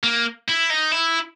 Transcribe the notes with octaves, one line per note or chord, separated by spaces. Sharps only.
A#3
E4
D#4
E4